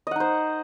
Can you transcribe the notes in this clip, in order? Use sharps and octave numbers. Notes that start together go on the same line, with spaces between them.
D#4 C5 D#5 F#5